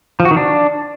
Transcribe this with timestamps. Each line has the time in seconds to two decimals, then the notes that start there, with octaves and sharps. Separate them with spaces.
0.20 F3
0.25 F#4
0.31 D#3
0.37 D4